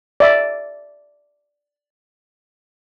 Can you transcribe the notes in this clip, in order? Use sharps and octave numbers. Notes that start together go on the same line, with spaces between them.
D5 E5